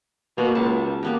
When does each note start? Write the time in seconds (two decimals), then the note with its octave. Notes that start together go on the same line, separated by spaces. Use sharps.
0.38 B2 A#3
0.55 C#2 A5
1.03 A#3 B3 G4